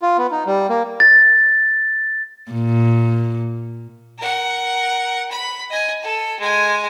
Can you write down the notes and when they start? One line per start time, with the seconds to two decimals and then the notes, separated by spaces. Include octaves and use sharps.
0.02 F4
0.18 B3
0.32 D#4
0.46 G3
0.69 A#3
1.00 A6
2.52 A#2
4.19 A#4 F#5
5.32 B5
5.70 D#5 G#5
6.02 A4
6.40 G#3 G#5